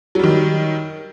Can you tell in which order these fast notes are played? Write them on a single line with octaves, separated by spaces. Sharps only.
F#3 G3 D#3